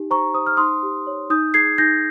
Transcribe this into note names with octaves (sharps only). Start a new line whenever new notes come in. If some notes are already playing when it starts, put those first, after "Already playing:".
Already playing: D#4 G4
C5 A#5 C#6
C5 D#6
F6
D#4 C6 D#6
G4
C#5
D#4 D#6 G6
G#4 G#6 C7
D#4 G6 A#6